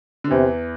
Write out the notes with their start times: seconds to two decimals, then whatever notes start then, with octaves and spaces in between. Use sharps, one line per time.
0.24 D3
0.30 E2 C3 E3